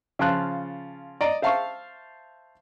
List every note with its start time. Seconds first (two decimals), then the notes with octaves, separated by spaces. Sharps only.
0.19 C#3 F3 F4 A5 F#6
1.21 D5 D#5 A#5
1.42 C5 E5 F5 A5 C#6